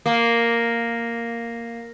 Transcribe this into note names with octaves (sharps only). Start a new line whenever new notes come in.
A#3